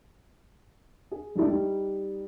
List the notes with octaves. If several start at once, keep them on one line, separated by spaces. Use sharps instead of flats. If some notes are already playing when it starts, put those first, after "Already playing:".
G#4
G2 G3 A3 D4 E4
G3 D#4